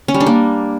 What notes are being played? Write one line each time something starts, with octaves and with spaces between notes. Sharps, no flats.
C#4
G3
D4
A#3